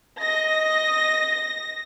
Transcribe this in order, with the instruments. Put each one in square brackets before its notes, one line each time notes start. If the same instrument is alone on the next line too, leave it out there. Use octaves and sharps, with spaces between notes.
[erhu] D#5 [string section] A#6